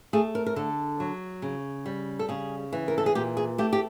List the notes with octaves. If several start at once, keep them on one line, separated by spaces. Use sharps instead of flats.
A3 G#4
A#4
A#4
D3 A4
F#3
C#3
G3
A4
C#3 G#4
E3
A#4
A4
G#4
A#2 G4
G#4
A3 G4
G4